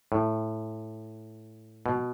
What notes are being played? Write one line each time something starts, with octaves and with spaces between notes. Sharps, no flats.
A2
B2